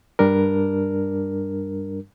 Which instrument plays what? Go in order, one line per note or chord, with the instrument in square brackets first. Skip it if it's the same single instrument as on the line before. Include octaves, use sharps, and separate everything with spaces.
[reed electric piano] G2 G3 D4 A#4